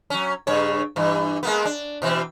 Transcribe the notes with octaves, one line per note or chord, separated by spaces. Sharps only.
F#3 C#4
G2 C#3 C#5
G2 E3
G#3 A#3 B3
D4
B2 E3 C4